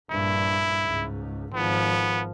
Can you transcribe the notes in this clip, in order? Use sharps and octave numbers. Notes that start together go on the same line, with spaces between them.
A#1 G2 E4
C#2 G#2
G#1 F3 B3